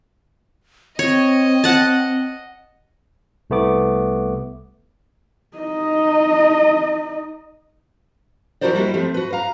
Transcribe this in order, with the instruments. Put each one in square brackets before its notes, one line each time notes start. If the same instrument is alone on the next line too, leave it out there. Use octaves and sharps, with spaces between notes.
[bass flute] C4 [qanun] C#5 [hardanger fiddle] D#5
[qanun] F#5 A5
[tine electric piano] C2 A3 B3 D6
[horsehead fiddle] D#4 D#5
[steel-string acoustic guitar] F3 E4 F#4 A#4 C5 D5
G3 G#3 A#3 B3 E4 F#4
F3 A3 C4
F#4 B4
F5 A#5